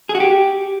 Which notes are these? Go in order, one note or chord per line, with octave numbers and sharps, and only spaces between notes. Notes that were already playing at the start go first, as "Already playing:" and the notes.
G#4
F#4
G4